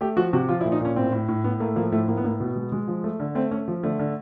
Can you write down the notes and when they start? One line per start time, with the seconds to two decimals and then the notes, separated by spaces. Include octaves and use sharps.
0.01 A3 G4
0.16 F3 F#4
0.33 C3 F#4
0.49 F3 F4
0.61 E4
0.65 A#2
0.72 D#4
0.80 A#2 C#4
0.96 A2 C4
1.12 A2
1.28 A2
1.44 A2 B3
1.60 A3 A#3
1.76 F3 A#3
1.92 A2 A3
2.08 A2 A#3
2.17 B3
2.24 A2 A#3
2.40 B2 B3
2.56 G#3
2.72 G#3
2.88 F3
3.04 A3
3.20 D3
3.35 A3 C4
3.51 A3 C#4
3.68 F3
3.83 D3 A3
3.99 D3